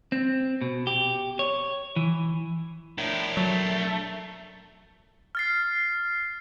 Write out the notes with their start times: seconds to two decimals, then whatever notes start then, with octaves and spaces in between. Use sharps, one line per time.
0.12 C4
0.61 B2
0.87 G4
1.39 C#5
1.96 E3
2.98 A2 D4 A#4
3.37 F#3 A3
5.35 F6 A6 C7